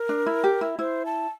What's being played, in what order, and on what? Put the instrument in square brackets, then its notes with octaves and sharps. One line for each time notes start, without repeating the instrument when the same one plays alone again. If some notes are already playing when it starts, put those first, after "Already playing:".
Already playing: [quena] A#4
[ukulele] D4
E4
G4
E4
[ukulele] E4 [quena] C5
[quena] A5